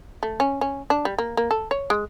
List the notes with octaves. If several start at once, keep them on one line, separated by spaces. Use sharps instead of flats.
A3
C#4
C#4
D4
G3
A#3
A#3
A4
C#5
G#3